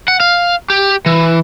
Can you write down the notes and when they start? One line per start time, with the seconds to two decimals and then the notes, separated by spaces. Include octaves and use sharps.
0.08 F#5
0.20 F5
0.70 G4
1.06 E3